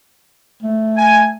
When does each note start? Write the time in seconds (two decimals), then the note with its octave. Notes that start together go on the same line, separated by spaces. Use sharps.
0.62 A3
0.97 G#5